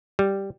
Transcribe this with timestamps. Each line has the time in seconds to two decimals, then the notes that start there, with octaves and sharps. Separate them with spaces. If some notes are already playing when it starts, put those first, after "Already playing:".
0.19 G3